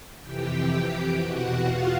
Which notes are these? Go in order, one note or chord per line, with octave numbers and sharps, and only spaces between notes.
F2 C3 E3 G4 G5
E2 B2 F#4 F#5
F4 F5